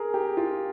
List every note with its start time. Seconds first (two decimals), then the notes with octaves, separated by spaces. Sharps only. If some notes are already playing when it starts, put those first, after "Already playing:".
Already playing: G#4 A#4
0.14 G4
0.37 F4